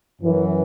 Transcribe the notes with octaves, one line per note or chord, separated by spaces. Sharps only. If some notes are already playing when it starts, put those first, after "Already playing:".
F#2 E3